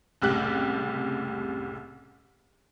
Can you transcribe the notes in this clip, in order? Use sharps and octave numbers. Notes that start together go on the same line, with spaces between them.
F#1 C2 A2 G4 F#6